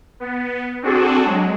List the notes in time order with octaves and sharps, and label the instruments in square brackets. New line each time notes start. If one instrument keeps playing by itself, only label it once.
[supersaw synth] B3
C4 D4 F#4 G#4 A4
F#3 G#3